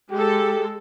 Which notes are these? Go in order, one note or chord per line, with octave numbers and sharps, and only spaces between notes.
G#3 G4 A4